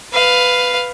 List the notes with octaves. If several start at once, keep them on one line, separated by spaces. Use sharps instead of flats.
B4 F5